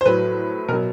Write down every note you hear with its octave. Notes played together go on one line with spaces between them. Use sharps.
C5
A2 F#3 B4
B2 F#3 A#4